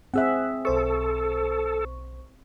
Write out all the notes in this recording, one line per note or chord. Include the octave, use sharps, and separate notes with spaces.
C4 G#4 E5 F#5 E6 F#6
B1 A4 C5 C#6